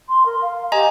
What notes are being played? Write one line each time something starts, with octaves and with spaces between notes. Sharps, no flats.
C6
A#4
F5
G4 D#5 G#5 A#5